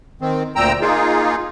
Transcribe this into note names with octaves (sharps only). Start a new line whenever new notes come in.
D#3 C4
D2 A#2 G5 A#5 E6
A#3 D#4 F4 G#4